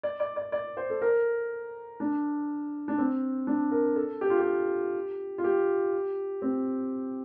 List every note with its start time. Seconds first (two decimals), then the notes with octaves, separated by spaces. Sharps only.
0.03 D5
0.20 D5
0.36 D5
0.52 D5
0.77 C5
0.90 A4
1.02 A#4
2.00 D4
2.88 D4
2.98 C4
3.47 D4
3.71 A#4
3.96 A4
4.21 G4
4.30 F4
4.39 G4
5.38 F4
5.44 G4
6.42 C4